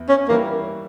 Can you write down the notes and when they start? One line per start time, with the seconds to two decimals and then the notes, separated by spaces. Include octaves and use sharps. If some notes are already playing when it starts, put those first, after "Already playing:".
Already playing: E2 E4
0.09 C#4
0.29 E3 G3 A#3 C#4 E4